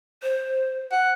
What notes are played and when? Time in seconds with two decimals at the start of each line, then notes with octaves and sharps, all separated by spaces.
0.23 C5
0.92 F#5